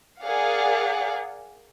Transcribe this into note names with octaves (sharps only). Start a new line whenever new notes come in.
G#4 A#4 D5 F5 F#5